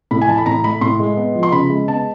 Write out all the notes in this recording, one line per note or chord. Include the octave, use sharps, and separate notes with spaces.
A2 B5
G#5
E3 A5
B5
A2 A#5
A3 B5
A2 C6
G#3
B3
F3
C6
C#3 B5
G#3
B3 A5